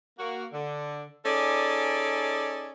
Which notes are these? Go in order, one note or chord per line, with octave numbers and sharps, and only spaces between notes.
A#3 F#4
D3
C#4 D#4 G#4 A4 D5